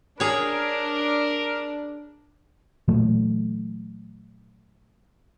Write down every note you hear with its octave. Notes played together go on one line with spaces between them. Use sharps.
D4 G#4 A#4 C#5
A#2 E3 F#3 A3